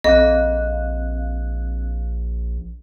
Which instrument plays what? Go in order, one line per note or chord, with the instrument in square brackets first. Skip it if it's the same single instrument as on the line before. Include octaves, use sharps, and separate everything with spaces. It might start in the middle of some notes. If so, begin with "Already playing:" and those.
[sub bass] A#1 [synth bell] C4 F5 F#6 [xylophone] D#5